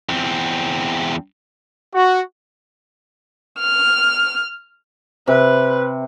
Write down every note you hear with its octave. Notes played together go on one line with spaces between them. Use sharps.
E2 C4
F#4
F6
C3 B4